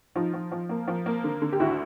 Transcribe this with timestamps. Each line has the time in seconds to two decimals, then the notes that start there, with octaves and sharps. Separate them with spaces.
0.15 F3 D#4 F4
0.33 F3
0.51 F3
0.69 A#3
0.88 F3
1.06 A#3
1.24 D3
1.42 D3
1.52 G4
1.60 D2 E4 F#4